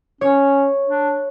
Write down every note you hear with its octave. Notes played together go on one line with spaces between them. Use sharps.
C#4 C#5
D4